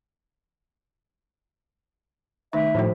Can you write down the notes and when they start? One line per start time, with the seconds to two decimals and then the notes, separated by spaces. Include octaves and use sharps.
2.53 D#3 A3 D#4 E5
2.75 A2 F3 F#4 C5